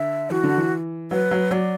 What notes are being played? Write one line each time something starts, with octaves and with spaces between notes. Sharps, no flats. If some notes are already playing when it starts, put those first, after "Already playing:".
Already playing: D3 E5
E3 F#4
D3
E3
F#3 B4
F#3
F#3 D5